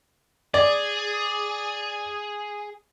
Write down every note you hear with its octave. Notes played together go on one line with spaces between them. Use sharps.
G#4 D5